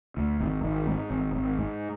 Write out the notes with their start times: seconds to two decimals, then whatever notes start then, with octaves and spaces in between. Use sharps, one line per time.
0.17 D2
0.40 G#1
0.63 G#1
0.87 G#2
1.10 G#1
1.35 G#1
1.59 G#2